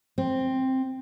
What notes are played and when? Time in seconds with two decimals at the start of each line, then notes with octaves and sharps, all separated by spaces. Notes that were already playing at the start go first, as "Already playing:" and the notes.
0.18 C4